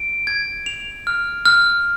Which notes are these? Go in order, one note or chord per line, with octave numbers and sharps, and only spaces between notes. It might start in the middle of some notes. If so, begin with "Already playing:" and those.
Already playing: D7
G#6
F7
F6
F6